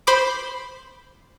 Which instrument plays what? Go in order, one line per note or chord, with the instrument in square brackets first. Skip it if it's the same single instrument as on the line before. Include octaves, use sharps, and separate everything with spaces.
[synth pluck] C5 B5 D6